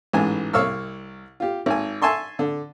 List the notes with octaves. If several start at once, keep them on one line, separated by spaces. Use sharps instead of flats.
A1 G#2 E3 G#5
C2 C#5 F5 E6 F6
F4 G4
G#1 G#5
E5 G#5 A5 C6 C#6
D3